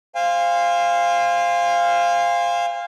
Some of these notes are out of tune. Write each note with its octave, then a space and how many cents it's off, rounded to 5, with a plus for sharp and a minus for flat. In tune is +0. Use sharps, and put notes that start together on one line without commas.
C5 +0 F5 -5 G#5 -40